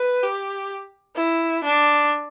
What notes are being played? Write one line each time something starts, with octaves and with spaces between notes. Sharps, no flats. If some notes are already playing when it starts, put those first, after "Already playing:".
Already playing: B4
G4
E4
D4